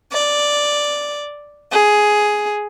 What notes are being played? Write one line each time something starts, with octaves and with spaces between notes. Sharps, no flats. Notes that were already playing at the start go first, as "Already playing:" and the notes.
D5
G#4